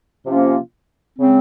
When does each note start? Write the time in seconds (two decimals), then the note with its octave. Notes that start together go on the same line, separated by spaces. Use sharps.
0.25 C3 F3 A#3 C#4 F4
1.18 C#3 G#3 C4